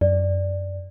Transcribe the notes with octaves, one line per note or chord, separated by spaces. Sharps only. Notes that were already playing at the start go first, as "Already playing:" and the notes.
F#2 D5